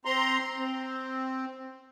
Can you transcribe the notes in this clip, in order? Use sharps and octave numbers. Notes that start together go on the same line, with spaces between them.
C4 A#5 C6
C4